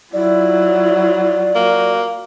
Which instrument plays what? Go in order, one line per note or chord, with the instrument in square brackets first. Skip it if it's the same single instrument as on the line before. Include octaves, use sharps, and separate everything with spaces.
[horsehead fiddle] F#3 F4 [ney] E4 [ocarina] D5
[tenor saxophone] A#3 [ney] F#4